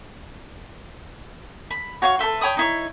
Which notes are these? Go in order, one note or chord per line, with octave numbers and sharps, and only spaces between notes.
B5
F#4 C#5 F5 C#6
A4 B4 E5 C6
C#5 G5 B5 D#6
D#4 E4 C#5